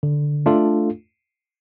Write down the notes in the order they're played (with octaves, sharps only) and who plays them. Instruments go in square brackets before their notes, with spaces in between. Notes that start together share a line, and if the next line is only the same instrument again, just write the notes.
[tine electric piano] D3
A3 D4 F4 A4